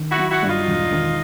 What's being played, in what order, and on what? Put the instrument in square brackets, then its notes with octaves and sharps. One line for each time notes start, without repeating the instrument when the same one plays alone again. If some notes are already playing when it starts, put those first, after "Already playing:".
Already playing: [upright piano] D#3
[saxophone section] E4 F#4
[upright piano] F#3
[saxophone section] E4 F#4
[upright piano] G2
[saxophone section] D#4 F4
[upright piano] E1
D#3